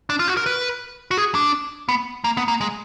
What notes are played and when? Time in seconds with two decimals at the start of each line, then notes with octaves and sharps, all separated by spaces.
0.10 D4
0.19 F4
0.28 F#4
0.37 A#4
0.46 B4
1.11 F#4
1.18 G#4
1.35 D4
1.89 B3
2.24 A#3
2.37 B3
2.48 A#3
2.61 G#3